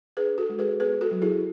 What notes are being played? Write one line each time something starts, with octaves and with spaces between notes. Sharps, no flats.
D4 G#4 B4
F#4 A4
G#3
G#4 B4
B3 G#4 B4
F#4 A4
F#3
E4 G#4